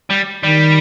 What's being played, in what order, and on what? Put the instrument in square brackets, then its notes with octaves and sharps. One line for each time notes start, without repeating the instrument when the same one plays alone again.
[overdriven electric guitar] G3
[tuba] D#3 [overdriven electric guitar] G3